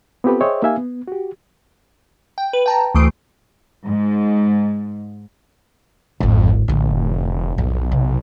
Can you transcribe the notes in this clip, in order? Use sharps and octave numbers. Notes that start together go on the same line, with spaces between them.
B3 C4 F4 G4 A4 B4
G#4 C5 C#5 D#5 E5 G5
A#3 D#4 G4 E5 F5 G#5
B3
F#4 G4
G5
B4
G5 A5 A#5
D2 E3 A3 D#6 C7 D7
G#2
D1 G#1 F2
A#1 A2 D3
F1
B1 F2
C3